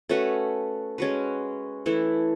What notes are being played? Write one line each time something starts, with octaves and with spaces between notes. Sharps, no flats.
A3 C#4 F#4 B4
G#3 C#4 F#4 B4
E3 A3 E4